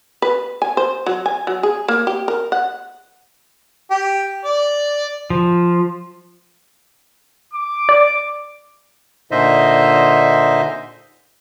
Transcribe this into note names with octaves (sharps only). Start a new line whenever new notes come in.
B4
G#5
C5
F#3
G#5
F#3
G#4
A#3
G4
A#4
F#5
G4
D5
F3
D6
D5
A#2 D3 D#4 C5 D#5 E5